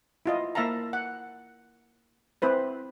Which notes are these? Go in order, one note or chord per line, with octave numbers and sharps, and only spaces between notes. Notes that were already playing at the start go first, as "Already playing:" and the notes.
E4 F4 D#5
A#3 E4 E5 F5 A5 A#5
F#5
C4 E4 B4 C5